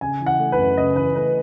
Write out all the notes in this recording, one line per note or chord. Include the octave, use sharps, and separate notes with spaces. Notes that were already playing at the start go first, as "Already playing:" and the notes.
C#3 G#5
E3
F#5
A3
B4
F#2
C#3 D#5
E3 B4
A3 B4